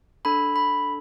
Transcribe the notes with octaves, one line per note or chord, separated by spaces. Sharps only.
D4 A4 B5
B5